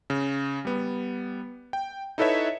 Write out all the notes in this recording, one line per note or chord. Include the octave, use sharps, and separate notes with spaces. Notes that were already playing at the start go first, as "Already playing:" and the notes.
C#3
G3 B3
G5
D#4 E4 A4 B4 C#5 E5